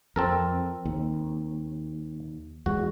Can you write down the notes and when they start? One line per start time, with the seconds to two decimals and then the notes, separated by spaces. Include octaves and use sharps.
0.16 F2 C4 A4 A#4
0.85 D#2
2.66 E2 G#3 F#4